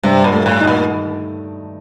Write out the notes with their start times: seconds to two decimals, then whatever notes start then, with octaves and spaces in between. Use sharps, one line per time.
0.03 G2 C3
0.24 A#2
0.32 A3
0.46 A2
0.61 D#4
0.67 A#2